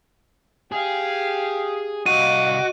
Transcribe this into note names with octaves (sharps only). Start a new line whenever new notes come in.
G4 G#4 F5
C2 F#4 D#5 F5 D6 D#7